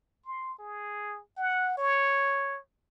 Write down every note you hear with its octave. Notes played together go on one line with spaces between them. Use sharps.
C6
G#4
F#5
C#5